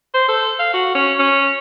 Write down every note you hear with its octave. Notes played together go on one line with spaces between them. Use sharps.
C5
A4
F5
F#4
C#4
C#4